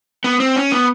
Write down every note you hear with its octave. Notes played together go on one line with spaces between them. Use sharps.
B3
C4
C#4
B3